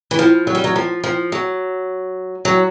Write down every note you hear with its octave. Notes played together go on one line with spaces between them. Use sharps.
E3
F3
F#3
G3
F#3
F3
F3
F#3
F#3